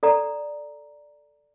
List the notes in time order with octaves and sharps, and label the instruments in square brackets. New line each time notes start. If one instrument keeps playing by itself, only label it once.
[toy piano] A4 D5 A#5